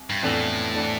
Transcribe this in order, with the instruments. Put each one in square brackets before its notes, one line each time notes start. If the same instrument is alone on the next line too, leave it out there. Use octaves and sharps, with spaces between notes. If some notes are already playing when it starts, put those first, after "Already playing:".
Already playing: [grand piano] C2
[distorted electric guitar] G2
[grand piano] F2 E3 B3 D4 A4 [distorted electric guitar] A2
[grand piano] E3 B3 D4 A4